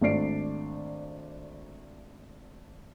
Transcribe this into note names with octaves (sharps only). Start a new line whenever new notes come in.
G#1 A3 D4 D5 C7 D7